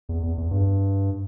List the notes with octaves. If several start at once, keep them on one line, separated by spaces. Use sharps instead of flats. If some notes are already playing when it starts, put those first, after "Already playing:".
E2
E2
E2
G2